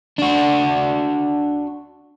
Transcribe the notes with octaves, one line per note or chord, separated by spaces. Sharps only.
D4 F#4